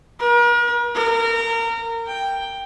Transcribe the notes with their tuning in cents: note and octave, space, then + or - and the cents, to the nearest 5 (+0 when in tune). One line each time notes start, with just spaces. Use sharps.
A#4 +45
A#4 -25
G5 +5